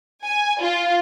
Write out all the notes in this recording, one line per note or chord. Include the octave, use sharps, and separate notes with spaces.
G#5
F4